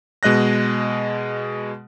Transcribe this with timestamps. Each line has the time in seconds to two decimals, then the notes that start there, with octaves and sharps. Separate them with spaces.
0.23 B2 G#3 D#5 F#6 A#6